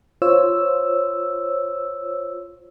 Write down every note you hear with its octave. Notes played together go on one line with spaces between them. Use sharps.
F4 C5 C#5 E6